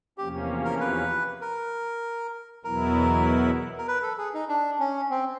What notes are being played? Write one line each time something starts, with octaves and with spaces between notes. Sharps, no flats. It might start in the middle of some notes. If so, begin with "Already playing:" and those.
E2 C3 F3 A#3 C#4 G4
A#4
B4
A#4
E2 B2 F#3 B3 E4 A#4
A#4
B4
A4
G#4
D#4
D4
C#4
C4